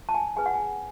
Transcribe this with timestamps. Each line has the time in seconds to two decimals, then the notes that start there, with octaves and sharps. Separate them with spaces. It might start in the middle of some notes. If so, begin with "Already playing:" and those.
0.09 A5
0.14 G#5
0.36 C#4 G#4 B4 G#5
0.46 F#5
0.54 G#5